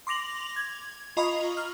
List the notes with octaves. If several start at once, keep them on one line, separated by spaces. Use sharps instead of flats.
C6 D6 A#6 F7 F#7
G#6
F4 D#5 A#5 B5 C#6 D#6
F6